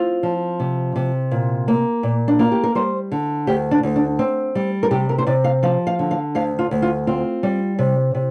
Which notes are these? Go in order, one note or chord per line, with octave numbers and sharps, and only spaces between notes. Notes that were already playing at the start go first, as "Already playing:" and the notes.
Already playing: C4 F4
F3
C3
C3
A#2
A#3
A#2
D4
A#3 F4
G4
A#4
G3 C5
D3
D2 G4
D4
D2
D4
C4
G3
A#4
C3 G4
A#4
C5
C3 D5
F5
F3 F5
F5
D3
F5
D2 F5
F4
D2
F4
C4 F4
G3
C3
C3